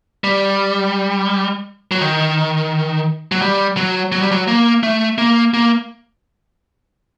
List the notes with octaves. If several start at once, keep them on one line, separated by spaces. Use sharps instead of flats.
G3
F#3
D#3
F#3
G3
F#3
F#3
G3
F#3
A#3
A3
A#3
A#3